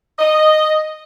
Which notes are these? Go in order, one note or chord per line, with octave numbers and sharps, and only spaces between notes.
D#5